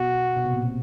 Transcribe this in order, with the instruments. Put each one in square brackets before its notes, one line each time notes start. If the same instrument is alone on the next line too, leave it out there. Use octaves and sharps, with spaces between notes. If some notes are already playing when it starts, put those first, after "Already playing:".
Already playing: [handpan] B2 [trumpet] F#4
[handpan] B2
C3
A#2
B2